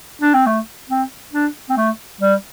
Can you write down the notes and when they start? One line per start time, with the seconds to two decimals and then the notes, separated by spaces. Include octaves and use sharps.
0.22 D4
0.34 C4
0.46 A3
0.90 C4
1.33 D4
1.70 C4
1.77 A3
2.21 G3